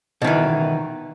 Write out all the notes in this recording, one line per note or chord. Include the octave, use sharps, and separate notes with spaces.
B2 D#3 E3